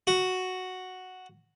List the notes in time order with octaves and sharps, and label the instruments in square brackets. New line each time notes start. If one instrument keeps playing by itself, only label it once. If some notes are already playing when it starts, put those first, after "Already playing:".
[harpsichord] F#4